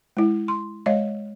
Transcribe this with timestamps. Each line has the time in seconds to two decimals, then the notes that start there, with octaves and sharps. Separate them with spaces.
0.17 G#3 E4
0.48 C6
0.86 G#3 C#5 D#5 F5